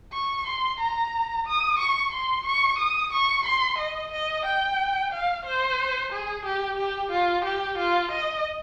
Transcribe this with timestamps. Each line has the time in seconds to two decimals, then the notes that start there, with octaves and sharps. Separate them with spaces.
0.14 C#6
0.47 C6
0.80 A#5
1.47 D#6
1.79 C#6
2.13 C6
2.46 C#6
2.79 D#6
3.13 C#6
3.46 C6
3.79 D#5
4.12 D#5
4.46 G5
5.12 F5
5.46 C5
6.13 G#4
6.46 G4
6.78 G4
7.12 F4
7.45 G4
7.78 F4
8.11 D#5